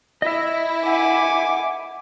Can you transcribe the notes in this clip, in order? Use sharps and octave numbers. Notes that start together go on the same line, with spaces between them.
E4 D#5 E5
F#5 G#5 D6